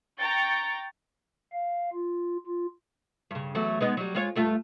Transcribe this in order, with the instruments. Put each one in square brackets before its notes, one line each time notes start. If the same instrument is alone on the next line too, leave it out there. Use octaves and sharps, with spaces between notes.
[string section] G5 A#5 C#6 A6
[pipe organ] F5
F4
F4
[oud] G2 C#3
E2 F#3 A3
G#3 B3 D#4
F#3 G3
G#3 F4 C#5
G2 A3 F4